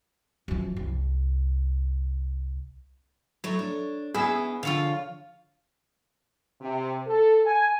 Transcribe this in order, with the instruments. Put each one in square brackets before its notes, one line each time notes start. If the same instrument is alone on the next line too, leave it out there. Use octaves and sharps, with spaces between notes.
[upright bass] F#2 F3
C2
[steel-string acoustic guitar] F#3 A3 E4 [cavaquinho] C#5
[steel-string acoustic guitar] D4
[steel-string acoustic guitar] B3 C#4 [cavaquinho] E4 [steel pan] G#4 E6
[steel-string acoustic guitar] D3 F3 [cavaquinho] F4 C#5 F5
[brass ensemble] C3
A4
G#5